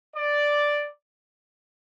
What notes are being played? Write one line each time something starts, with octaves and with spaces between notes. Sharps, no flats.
D5